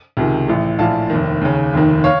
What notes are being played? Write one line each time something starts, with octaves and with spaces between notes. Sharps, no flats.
C#2 C3 D#3
A1 A2
A#1 A2 F5 A5
F1 D#2 D#3
D#2 C#3
F1 D#2 D#3
C#5 F5